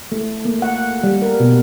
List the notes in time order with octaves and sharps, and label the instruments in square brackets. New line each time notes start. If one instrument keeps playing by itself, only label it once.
[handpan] A3
A#3
F#5
G3
A#4
B2